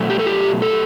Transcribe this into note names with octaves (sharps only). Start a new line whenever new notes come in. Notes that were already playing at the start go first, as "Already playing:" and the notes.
Already playing: B2 F#3 A3
G4
A4
G4
A4